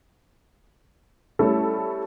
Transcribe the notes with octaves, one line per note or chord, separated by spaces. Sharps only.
G3 A3 C#4 E4 A4